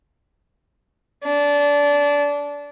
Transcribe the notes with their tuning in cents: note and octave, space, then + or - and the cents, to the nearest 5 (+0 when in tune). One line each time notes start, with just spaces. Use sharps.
D4 -25